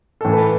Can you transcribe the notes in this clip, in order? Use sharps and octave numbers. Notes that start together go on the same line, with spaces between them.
A2 E3 A4
B4